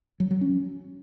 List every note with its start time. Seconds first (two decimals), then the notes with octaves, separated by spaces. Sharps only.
0.20 F#3
0.31 F#3
0.41 C#4